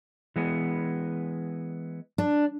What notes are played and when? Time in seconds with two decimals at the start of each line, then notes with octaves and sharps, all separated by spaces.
0.36 E3 G#3 B3
2.18 D4